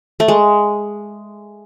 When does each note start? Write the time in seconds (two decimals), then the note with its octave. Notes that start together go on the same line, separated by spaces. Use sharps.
0.20 A3
0.28 G#3